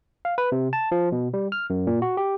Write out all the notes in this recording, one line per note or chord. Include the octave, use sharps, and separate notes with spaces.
F5
B4
C3
A5
F3
B2
G3
F6
F#2
A#2
F#4
G4